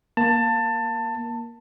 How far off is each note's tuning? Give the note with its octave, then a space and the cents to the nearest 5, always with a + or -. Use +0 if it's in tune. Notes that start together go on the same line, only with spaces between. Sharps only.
A#3 +15 A5 +20